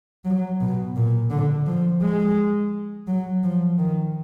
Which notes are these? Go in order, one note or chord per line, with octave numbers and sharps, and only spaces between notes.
F#3
B2
A#2
D3
F3
G#3
F#3
F3
D#3